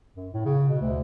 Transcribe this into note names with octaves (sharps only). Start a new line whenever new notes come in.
F#2
A2
C#3
B2
D2